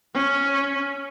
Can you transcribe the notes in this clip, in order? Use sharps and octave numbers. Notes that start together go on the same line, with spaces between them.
C#4